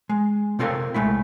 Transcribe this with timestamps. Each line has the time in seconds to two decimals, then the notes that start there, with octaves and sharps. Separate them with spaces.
0.09 G#3
0.59 C3 C4 F4 A4 A#4 F5
0.94 C2 G#3 A3 E4